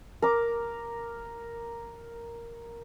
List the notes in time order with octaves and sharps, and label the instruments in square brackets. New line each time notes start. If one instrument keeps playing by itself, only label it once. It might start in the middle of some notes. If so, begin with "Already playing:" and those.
[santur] A#4 D6